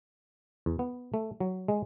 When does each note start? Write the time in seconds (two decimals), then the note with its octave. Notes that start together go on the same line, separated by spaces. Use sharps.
0.66 E2
0.79 B3
1.14 A3
1.40 F#3
1.68 G#3